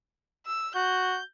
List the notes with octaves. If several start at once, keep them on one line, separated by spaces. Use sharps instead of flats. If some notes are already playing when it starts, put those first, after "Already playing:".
E6
F#4 G6